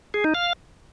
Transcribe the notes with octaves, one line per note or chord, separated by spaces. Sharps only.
G#4
D#4
F5